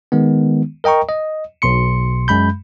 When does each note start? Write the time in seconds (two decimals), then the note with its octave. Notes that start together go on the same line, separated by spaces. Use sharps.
0.12 D#3 G#3 B3
0.84 A#4 D#5 G5 A#5 C#6
1.09 D#5
1.62 B1 B2 C6 C#7
2.28 F#2 G#3 B5 G6